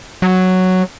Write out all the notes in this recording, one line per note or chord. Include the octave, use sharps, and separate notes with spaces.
F#3